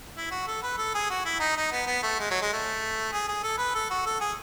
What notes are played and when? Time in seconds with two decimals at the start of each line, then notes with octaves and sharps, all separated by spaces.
0.16 E4
0.31 F#4
0.47 A4
0.63 B4
0.78 A4
0.94 G#4
1.10 F#4
1.25 E4
1.40 D#4
1.57 D#4
1.72 B3
1.87 B3
2.03 A3
2.19 G#3
2.31 F#3
2.42 G#3
2.53 A3
3.12 G#4
3.28 G#4
3.43 A4
3.58 B4
3.75 A4
3.90 F#4
4.06 A4
4.21 G#4